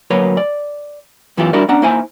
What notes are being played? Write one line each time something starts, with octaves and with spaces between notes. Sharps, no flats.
D2 F#3 A#3 B4 C#5 B5
D5
F#2 E3 B3 E4 F4 G4
G3 D4 E4 F#4 A#4 D5
B3 C#4 D4 F#5 A#5
A#3 D#4 E4 C5 E5 G#5